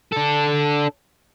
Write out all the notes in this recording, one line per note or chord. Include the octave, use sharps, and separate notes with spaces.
D4 A4